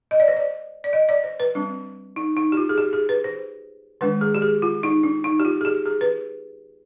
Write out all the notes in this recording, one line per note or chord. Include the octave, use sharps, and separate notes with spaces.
D#5
D5
C5
D5
D5
D#5
D5
C5
B4
G3 C4 D4
D#4
D#4
G4
F4
G#4
G4
G#4
B4
C5
D#3 G#3 D4 B4
G#4
G4
G#4
F4
D#4
D4
D#4
G4
F4
G#4
G4
G#4
B4